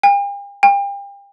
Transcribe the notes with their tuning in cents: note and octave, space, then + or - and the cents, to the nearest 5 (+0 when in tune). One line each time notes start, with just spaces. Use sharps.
G5 +45
G5 +35